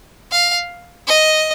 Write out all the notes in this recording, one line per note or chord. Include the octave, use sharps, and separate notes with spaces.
F5
D#5